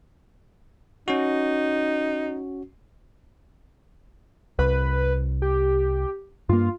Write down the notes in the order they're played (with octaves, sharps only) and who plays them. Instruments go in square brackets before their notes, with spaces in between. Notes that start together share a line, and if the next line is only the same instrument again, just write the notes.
[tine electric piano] C#4 F#4 [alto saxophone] D#4
[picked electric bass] C2 [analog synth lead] B4
[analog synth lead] G4
[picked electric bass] G2 A#3 [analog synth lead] F4